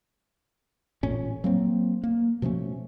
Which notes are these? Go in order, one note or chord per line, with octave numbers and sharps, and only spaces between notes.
A1 A#2 C#4
F#3 A#3 C4
A#3
B2 F3 A3 C#4